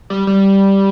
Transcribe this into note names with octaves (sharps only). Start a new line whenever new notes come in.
G3
G3